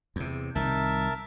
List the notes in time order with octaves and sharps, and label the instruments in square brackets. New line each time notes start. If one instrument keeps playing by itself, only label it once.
[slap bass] E2 C3
[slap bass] C2 D#3 [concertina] A#4 E5 A5